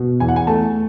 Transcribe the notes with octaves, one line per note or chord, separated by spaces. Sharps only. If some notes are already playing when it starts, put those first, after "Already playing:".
Already playing: B2
E2 G#5
F#5
G#5
A3 A5